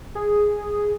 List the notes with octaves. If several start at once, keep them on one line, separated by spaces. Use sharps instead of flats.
G#4